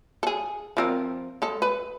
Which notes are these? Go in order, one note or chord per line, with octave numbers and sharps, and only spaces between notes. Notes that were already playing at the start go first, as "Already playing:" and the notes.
G#4 A4
F3 C4 A#4
G#3 A4
B4